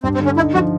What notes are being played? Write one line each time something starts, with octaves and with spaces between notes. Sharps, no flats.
G2 C4
C4
D3
C#4
D#4 E4
F3 F#4